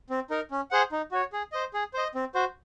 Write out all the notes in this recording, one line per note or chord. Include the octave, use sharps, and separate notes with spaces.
C4
D#4 A#4
C#4
G#4 C5 F#5
D#4
F#4 C#5
G#4
C5 D#5
G#4
C5 D#5
C4
F#4 C5